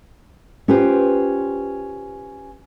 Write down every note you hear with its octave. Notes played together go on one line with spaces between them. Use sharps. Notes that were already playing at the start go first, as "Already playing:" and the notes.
C#4 F4 G4 B4 C5